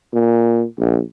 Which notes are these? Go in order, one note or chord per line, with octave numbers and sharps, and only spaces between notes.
A#2
A#1